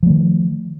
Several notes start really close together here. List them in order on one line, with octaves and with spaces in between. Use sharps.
F3 A3 D#3